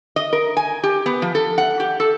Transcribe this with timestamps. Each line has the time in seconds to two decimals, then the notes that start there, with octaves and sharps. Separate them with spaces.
0.16 D#5
0.33 A#4
0.57 G#5
0.83 G4
1.06 B3
1.22 F3
1.35 A4
1.58 F#5
1.80 G4
2.00 A4